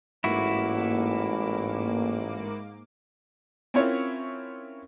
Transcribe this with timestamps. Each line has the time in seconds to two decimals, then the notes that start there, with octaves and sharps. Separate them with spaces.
0.24 A1 G#2 A#3 E4 F#4 D6
3.74 C4 C#4 E4 F4 A#4 C#5